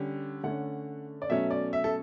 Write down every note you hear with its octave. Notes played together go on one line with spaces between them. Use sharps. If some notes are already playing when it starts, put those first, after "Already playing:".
Already playing: D3 G3 C#4
D3 A3 C#4 F#5
D5
B2 F#3 A3 C#4 E5
D5
E5
A4